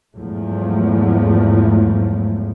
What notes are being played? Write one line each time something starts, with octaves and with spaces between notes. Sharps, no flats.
E2 G#2 F3 F#3 A3